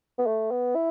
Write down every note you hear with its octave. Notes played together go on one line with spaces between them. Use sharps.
B3
A3
B3
E4